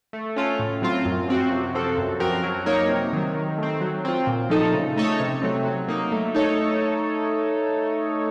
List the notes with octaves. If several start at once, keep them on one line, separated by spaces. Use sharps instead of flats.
A3
C#4 F4 A4
A2
F#3 C4 F4
F#2
F3 C4 F#4
C3
F3 C4 F#4 A4
F#2
F3 C4 F#4 A#4
F#3
A#3 D#4 A#4 C#5
C3
D#3 F#3
D#3
A3 C4
F#3
C4 F4
A#2
F3 A3 D#4 A4
C#3
A3 D#4 A4 C#5
C3
F#3 A3 C4
F#3
A#3 D#4
A3
D#4 A4 C#5